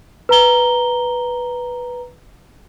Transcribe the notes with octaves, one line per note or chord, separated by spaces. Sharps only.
B4 A#5 G7